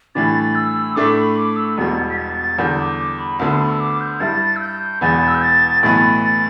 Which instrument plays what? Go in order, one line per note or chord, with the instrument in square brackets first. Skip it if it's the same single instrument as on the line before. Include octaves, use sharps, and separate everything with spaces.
[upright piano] A2 E3 G3 D4 [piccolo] A6
[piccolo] E6
[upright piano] A2 A3 D4 A4 [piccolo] D6
[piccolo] B5
D6
E6
[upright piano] E1 E2 B2 G3 [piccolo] A6
[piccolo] B6
A6
A6
[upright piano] E2 D3 G3 [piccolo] G6
[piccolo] D6
D6
B5
[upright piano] D2 D3 B3 [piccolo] A5
[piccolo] B5
E6
D6
G6
[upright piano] G2 G3 E4 [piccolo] A6
[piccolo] E6
G6
[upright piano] E1 E2 E3 B3 [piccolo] A6
[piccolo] E6
G6
A6
[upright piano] B1 A2 E3 B3 [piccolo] A6
[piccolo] A6